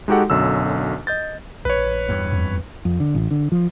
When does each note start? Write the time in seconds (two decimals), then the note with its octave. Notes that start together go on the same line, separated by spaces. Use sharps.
0.08 G#3 D#4 F#4 G4 A4 F#5
0.30 B1 F#2 D3 E6
1.07 D#5 G6 A6
1.65 A#1 B4 C#5
2.09 E2 G2
2.32 F2
2.85 F2
3.00 D3
3.15 A1
3.31 D3
3.52 F3